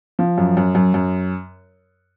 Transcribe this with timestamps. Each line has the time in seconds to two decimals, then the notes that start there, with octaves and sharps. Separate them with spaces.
0.19 F3
0.38 F#2
0.57 F#2
0.75 F#2
0.94 F#2